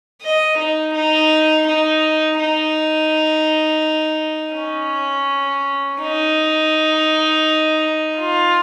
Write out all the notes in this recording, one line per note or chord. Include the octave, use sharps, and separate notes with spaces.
D#5
D#4
D#4
D#4
D#4
C#4
D#4
F4